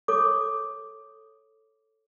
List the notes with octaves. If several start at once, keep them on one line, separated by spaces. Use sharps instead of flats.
A4 C#5 D6